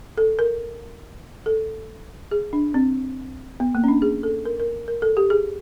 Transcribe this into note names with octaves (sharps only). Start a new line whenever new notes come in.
A4
A#4
A4
G#4
D4
C4
B3
A#3
C#4
D4
G#4
A4
A#4
A#4
A#4
A4
G4
G#4